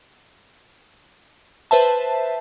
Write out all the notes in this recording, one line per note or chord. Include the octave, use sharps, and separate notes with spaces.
B4 C5 E5 A5